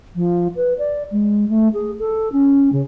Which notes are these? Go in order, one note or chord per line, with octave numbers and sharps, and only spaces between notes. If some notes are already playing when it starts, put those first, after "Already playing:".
F3
B4
D5
G#3
A3
G#4
A4
C#4
C#3